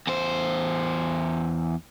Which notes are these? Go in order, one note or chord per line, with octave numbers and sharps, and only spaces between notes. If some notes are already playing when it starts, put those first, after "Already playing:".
E2 C5